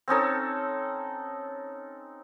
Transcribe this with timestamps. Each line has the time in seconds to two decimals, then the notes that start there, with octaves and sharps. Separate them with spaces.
0.08 C4 C#4 D#4 A4